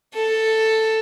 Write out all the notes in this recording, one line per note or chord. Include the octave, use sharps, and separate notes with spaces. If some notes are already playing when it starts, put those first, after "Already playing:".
A4